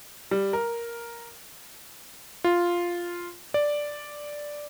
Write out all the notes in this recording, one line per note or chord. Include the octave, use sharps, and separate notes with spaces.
G3
A#4
F4
D5